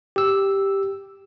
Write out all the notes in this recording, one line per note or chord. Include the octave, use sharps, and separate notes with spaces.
G4 E6